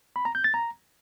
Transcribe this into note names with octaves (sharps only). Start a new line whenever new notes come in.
B5
A#5
G6
A6
A#5